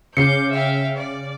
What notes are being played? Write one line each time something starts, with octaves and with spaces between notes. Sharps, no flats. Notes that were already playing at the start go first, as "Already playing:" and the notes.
C#3 D6 G6 C7 C#7
E5 F5 G5
D5